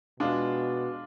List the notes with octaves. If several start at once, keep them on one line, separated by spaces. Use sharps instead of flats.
B2 G#3 D4 F4